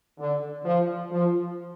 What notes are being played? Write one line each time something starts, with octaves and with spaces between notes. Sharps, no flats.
D3
F3
F3